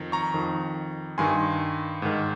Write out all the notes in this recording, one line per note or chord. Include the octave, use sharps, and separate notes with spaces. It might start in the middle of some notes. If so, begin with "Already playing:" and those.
Already playing: F2 D#3
A#5 C#6
F2 D#3
G2 D#3 G#5 C6
G#2 D#3